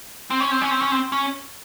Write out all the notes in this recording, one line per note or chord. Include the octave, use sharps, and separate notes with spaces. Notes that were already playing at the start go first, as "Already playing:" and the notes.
C4
C#4
C4
C#4
C4
C#4
C4
C#4